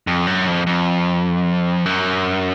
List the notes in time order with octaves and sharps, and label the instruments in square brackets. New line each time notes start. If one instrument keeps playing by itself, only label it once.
[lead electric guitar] F2
F#2
F2
F2
F#2